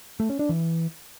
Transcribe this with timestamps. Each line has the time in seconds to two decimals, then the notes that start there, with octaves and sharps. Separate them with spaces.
0.20 A3
0.30 C#4
0.39 D4
0.49 E3